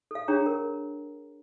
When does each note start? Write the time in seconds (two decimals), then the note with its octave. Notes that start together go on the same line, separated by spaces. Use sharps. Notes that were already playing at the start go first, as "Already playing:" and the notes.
0.11 A4 F5
0.28 D4 G#4 C#5 G5 A#5
0.46 A#4